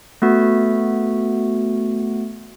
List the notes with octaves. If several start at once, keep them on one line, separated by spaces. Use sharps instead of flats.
A3 B3 F#4